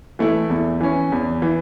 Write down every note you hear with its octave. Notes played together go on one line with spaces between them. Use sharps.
E3 A3 E4
E2
E3 C#4
E2
E3